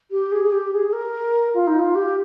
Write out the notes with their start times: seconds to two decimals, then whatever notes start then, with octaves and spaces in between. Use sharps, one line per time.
0.11 G4
0.32 G#4
0.43 G#4
0.52 G4
0.73 G#4
0.88 G#4
0.93 A#4
1.54 F4
1.67 D#4
1.79 F4
1.95 G4